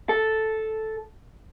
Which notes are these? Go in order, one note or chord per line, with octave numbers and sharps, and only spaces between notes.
A4